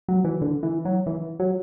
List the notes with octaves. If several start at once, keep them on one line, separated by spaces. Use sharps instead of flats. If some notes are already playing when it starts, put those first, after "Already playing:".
F#3
E3
D3
E3
F#3
E3
F#3